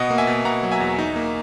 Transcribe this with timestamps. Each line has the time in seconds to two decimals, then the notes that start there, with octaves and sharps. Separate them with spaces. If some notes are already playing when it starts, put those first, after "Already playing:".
Already playing: B2 D#5 F#5
0.10 A#3
0.18 E5 G#5
0.27 B2
0.45 B2 F#5 A#5
0.63 F#3
0.72 E5 G#5
0.80 E2
0.98 D#4
1.16 A#3